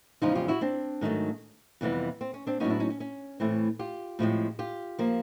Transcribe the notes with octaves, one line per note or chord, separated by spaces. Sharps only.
E2 C#3 F3 G#3 D#4 F4
F4 G4
E4 F#4
C4 D4
G#2 D#3 F#3 A3
F2 C3 E3 G3 B3
C4
C#4
C4 D4
A2 F#3 B3 C#4 D#4
D4 E4
C#4 D#4
C#4
C#4
A2 E3 A3 C4
F4 G4
A2 F3 G#3 C4
F4 G4
F3 A#3